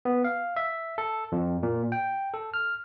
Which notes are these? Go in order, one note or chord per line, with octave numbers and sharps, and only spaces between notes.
B3
F5
E5
A4
F2
A#2
G5
A4
F6